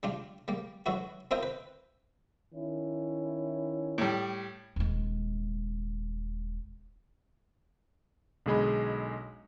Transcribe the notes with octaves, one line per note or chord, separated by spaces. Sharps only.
G3 D4 F4
G3 A#3
D3 E3 F#3 E4 F#4
C4 E4 F4 A#4 D#5 G5
B4
D#3 C#4 E4
A2 G3
D#1 G#3
B1 D3 G#3 G#4 D#5 B5